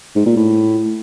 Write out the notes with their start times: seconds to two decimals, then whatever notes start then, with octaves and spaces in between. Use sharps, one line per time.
0.15 G#2
0.26 A#2
0.37 A2